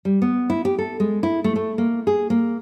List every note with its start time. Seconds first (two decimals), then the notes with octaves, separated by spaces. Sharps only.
0.05 G3
0.22 B3
0.50 E4
0.65 G4
0.79 A4
1.00 G#3
1.23 E4
1.44 A3
1.56 A3
1.78 A#3
2.07 G#4
2.30 A#3